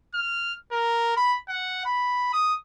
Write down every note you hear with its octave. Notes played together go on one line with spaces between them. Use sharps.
F6
A#4
B5
F#5
B5
D#6